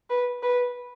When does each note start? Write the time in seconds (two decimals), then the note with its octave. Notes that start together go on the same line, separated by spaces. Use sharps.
0.10 B4
0.43 B4